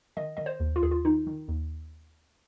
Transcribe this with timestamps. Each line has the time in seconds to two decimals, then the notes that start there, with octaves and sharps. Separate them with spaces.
0.17 D#3 D#5
0.37 D#3 D#5
0.46 C5
0.60 D#2
0.76 F4
0.82 D#2 G#4
0.91 F4
1.05 D#3 D#4
1.27 D#3
1.48 D#2